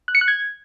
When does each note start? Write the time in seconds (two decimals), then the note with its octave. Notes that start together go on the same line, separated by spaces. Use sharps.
0.08 F#6
0.15 C#7
0.21 F#6
0.28 G#6